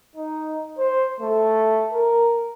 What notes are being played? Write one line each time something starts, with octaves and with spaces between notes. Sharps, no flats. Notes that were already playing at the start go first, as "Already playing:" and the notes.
D#4
C5
A3
A#4